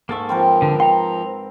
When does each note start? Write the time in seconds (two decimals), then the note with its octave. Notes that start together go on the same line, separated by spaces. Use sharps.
0.09 G#2 A#3 A4 E5 C#6
0.29 F3 C4 A#4 B4
0.62 D3
0.80 G5 A#5 C6